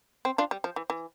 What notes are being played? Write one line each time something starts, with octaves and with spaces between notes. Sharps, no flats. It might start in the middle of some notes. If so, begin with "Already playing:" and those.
C4
D4 F4
G3
F3
E3
E3